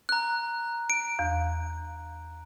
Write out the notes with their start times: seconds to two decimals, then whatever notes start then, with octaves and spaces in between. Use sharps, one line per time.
0.09 A#5 F#6
0.90 D7
1.19 E2